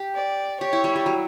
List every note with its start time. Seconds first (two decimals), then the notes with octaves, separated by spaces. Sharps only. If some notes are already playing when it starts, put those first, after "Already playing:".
Already playing: G4
0.15 D5
0.60 G4 C#5
0.73 E4
0.84 G3
0.96 G3
1.06 F#3